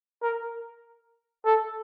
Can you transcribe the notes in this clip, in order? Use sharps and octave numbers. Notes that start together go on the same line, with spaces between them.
A#4
A4